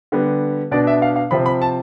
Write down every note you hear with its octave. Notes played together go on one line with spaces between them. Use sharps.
D3 G3 B3
B2 B3 D4 D5
E5
F5
F5
C3 F3 C4 B5
B5
A5